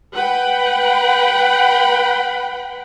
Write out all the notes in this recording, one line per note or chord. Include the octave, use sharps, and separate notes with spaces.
B4 F#5 G5 B5